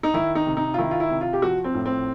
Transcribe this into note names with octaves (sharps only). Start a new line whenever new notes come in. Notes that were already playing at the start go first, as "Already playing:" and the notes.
D#4
D#3 E4
D#4
C3
D#4
F4
D#3 E4
F4
E4
C3
F4
G4
F3 F#4
C4
A2
C4